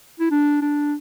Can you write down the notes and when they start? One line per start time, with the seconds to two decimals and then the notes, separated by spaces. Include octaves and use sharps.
0.20 E4
0.31 D4
0.62 D4